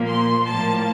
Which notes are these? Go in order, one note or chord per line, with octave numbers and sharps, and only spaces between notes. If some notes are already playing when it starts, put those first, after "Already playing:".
Already playing: A#2 F3 A#3
C6
A2 F3 A#3 A5